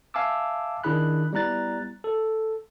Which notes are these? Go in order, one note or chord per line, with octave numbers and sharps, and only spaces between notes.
E5 F5 G#5 A5 D6 E6
D#3 D4 E4 G#4 B5 F#6
G3 B3 E4 A#5 F#6 A6
A4